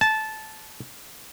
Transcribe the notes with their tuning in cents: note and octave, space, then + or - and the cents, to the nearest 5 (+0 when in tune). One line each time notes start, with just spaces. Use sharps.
A5 -15